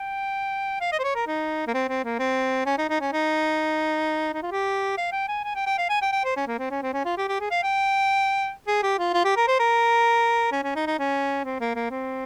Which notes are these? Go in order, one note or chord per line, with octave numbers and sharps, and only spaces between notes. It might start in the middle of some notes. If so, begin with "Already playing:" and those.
Already playing: G5
F5
D#5
C5
C#5
A#4
D#4
A#3
C4
C4
A#3
C4
C#4
D#4
D#4
C#4
D#4
D#4
F4
G4
F5
G5
G#5
G#5
G5
G5
F5
G#5
G5
G5
C5
C#4
A#3
C4
C#4
C4
C#4
F4
G4
G4
G#4
F5
G5
G#4
G4
F4
F4
G4
A#4
C5
A#4
C#4
C#4
D#4
D#4
C#4
C4
A#3
A#3
C4